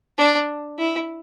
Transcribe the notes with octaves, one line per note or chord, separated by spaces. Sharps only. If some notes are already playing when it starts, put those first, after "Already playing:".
D4
E4